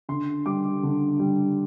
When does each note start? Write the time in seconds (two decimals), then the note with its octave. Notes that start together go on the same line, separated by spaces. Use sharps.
0.09 D3 C6
0.46 G3 D6
0.83 D3
1.19 G3